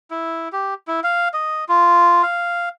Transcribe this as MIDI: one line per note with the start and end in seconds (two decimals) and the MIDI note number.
0.11 0.49 64
0.53 0.74 67
0.88 1.00 64
1.04 1.28 77
1.34 1.65 75
1.69 2.22 65
2.23 2.69 77